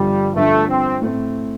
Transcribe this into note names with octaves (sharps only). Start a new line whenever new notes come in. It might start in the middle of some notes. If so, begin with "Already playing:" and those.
Already playing: G1 G2 D3 F3 G3
G1 G2 D3 F3 A3
C4
A2 A3 C4